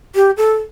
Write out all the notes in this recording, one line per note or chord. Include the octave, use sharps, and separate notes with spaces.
G4
A4